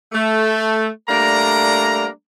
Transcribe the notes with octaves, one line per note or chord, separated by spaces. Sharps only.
A3
G3 A3 A#3 D4 A#5